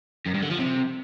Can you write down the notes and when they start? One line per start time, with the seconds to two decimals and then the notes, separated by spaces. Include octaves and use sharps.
0.26 F#2
0.34 G2
0.42 D3
0.50 F3
0.59 C3